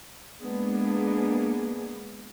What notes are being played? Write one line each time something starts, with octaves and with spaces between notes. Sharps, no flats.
G#3 A#3 B3 D4 G#4